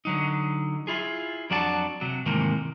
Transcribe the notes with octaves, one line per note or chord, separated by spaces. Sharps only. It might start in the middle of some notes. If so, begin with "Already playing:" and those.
D3 F#3 D#4
E4 F4 G#4
F2 F#3 D4 F#4 G#4 A5
C3 F#3
G#2 C3 D#3 E3 A3 A#3